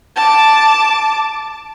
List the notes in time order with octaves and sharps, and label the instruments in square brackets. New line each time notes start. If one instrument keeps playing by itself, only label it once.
[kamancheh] A5 D6